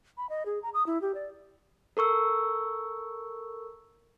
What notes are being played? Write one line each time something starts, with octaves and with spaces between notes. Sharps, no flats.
B5
D#5
G#4
A#5
D#6
E4
G4
D5
A4 A#4 C#6 E6